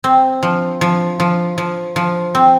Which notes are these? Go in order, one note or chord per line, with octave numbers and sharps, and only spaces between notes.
C4
F3
F3
F3
F3
F3
C4